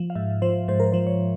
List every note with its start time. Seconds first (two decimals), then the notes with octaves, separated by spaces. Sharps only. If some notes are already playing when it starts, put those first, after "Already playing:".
Already playing: F3
0.10 F5
0.15 G#2 E5
0.42 F3 C5
0.68 G#2 C5
0.80 A#4
0.92 F3 C5
1.07 C#5